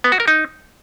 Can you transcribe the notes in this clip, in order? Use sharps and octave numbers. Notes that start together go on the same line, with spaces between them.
B3
F#4
A#4
D#4